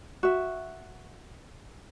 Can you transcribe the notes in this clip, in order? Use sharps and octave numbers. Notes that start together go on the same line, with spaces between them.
F#4 E5